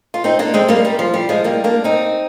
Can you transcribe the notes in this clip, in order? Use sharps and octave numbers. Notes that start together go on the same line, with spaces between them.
F4
C4 D#4
A#3 D4
G#3 C4
G3 A#3
G3
F3
G3
F3 G#3
G3 A#3
A#3 D4
C4 D#4